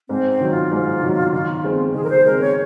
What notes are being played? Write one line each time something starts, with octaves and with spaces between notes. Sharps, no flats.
G#2 C4
C4
D#3 F#3
F4
G#2
D#3 F#3
D#3
G#3 C4
D#3 G#4
A#4
C5
G#3 C4 A#4
C#5